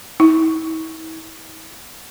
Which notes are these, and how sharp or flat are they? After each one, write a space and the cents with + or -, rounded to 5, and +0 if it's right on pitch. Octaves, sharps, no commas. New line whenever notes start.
E4 -40